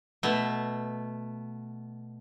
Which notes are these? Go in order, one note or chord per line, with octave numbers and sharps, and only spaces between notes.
B2 A3